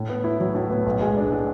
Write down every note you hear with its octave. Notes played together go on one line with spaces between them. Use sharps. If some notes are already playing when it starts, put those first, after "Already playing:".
Already playing: A2
B3
E4
F#3
A2
B3
B1
G#3
D4
A2